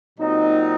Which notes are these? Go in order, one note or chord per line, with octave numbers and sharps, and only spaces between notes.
A#2 F#3 C4 D#4